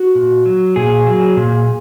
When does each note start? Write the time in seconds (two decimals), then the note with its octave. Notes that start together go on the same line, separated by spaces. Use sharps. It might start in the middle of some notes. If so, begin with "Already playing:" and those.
Already playing: F#4
0.15 A#2
0.46 F#3
0.76 A#2 G#4
1.07 F#3
1.37 A#2